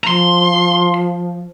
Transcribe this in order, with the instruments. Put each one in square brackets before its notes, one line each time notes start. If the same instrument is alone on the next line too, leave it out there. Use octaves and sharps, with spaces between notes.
[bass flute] F3 [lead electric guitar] A#5 C6